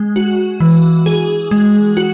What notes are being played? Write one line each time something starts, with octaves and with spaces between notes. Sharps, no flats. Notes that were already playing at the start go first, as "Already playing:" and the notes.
Already playing: G#3
F#4
E3
G#4
G#3
F#4